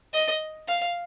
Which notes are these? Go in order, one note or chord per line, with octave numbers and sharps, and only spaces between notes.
D#5
F5